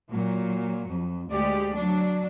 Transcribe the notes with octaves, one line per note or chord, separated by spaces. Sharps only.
A#2 F#3
F2
D2 G#3 G4 D5
F#3 D4